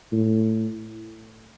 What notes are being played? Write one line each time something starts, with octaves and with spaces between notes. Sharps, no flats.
A2